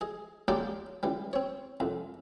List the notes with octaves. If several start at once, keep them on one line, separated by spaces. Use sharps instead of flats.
G#4 D#5
F#3 G#3 A#3 D4 G4 D5
C#2 E3 G3
C4 C#5
C2 F2